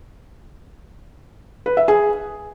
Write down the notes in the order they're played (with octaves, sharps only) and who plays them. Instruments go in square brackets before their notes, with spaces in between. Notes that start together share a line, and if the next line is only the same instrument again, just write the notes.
[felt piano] B4
E5
G#4